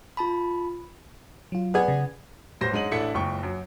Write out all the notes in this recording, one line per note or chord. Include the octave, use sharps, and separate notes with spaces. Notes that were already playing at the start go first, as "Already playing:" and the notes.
F4 A5 B5
F#3 F4
B3 G#4 B4 D5
C#3
A1 G3 C5 C6 A#6
G#2 G#3 C#4 D#7 F#7
A1 D4 E4 A4 B6 C#7
F#1 C#2 G5 C#6
F#2